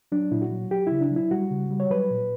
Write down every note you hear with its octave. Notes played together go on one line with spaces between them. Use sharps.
F#3 D4
A#2 E4
F#4
F#3
F#3 G4
C#3 E4
D4
F#3
E4
G3 F#4
C#3
G3
C#5
F#3 B4
A#2